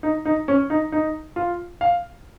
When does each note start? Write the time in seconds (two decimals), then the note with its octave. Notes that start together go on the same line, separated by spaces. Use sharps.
0.03 D#4
0.25 D#4
0.48 C#4
0.70 D#4
0.92 D#4
1.36 F4
1.81 F5